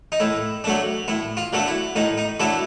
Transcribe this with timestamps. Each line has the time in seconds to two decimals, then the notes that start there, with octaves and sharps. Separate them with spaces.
0.12 D#4
0.20 A2 E4
0.64 F#3 A3 D4
1.08 A2 E4
1.37 F4
1.53 F#3 A3 D4
1.67 E4
1.96 A2 D#4
2.18 D#4
2.40 F#3 A3 D4 E4